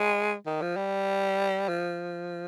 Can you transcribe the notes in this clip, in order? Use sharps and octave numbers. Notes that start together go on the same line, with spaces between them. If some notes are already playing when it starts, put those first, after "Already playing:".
Already playing: G#3
D#3
F3
G3
F3